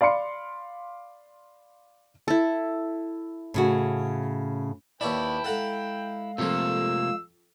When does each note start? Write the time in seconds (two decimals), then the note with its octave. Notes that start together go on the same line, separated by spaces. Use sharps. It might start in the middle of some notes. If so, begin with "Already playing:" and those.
0.01 D5 F5 B5 C6 C#7
2.28 E4 A4
3.54 A2 C#3 F#4
5.01 D#2 E4 B4 C#5 D5 G5 A5 B5
5.44 G#3 A4 F5 F#5 A#5
6.38 F2 C3 F3 A3 A#3 E6